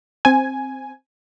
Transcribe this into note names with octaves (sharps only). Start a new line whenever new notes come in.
C4 G#5